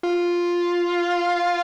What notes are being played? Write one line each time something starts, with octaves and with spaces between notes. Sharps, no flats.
F4